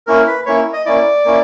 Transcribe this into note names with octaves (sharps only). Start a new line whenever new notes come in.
A#3 C#4 E4 A#4
B4
A#3 C#4 E4 C#5
D#5
A#3 C#4 E4 D5
A#3 C#4 E4